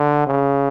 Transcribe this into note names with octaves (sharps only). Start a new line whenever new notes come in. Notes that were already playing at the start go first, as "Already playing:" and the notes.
Already playing: D3
C#3